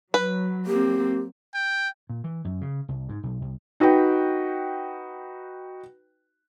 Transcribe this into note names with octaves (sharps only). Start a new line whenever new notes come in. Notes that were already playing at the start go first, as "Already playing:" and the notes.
F#3 B4
A#3 C4 G4
G5
A#2
E3
F#2
C#3
C2
G#2
B1
C2
D#4 F#4 B4 G5